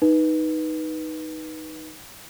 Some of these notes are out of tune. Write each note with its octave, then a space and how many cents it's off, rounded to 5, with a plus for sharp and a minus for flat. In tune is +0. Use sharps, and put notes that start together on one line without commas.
D#4 +5 B4 -15